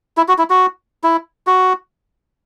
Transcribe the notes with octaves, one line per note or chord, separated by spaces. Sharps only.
E4
F#4
E4
F#4
E4
F#4